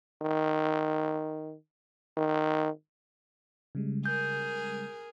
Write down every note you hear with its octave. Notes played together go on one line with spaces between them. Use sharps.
D#3
D#3
C#3 G3 G#3
G#4 A#4 G6